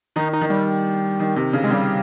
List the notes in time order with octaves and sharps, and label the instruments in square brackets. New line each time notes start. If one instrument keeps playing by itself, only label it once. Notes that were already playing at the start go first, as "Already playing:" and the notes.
[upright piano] D#3 [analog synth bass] D#4
[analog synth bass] D#4
[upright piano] D#3
[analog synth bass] G3
[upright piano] D#3
C3
C#3
[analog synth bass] G#3
[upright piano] C#3 [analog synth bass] G3